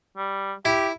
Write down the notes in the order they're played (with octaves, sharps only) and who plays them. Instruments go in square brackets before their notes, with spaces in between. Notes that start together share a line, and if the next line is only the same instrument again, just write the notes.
[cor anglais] G3
[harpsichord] E4 [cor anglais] G4